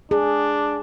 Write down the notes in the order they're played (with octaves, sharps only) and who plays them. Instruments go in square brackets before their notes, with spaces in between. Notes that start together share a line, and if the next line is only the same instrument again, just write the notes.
[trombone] D4 [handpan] G#4